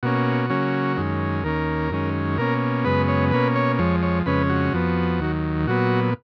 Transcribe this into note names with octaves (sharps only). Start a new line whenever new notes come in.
B2 A#3 C#4 F#4
C#3 F#3 A#3 C#4
F#2 D#3 G#3 C#4
D#2 D#3 A#3 C#4 A#4
F#2 D#3 G#3 C#4
B2 A#3 C#4 A#4
F#2 C#3 G#3 B3 B4
C#5
B2 A#3 C#4 B4
C#5
F2 F3 G#3 C#5
C#5
F2 C#3 G#3 C#4 B4
F#4
F2 F3 B3
D#2 D#3 F#3
A#2 F#3 B3 F#4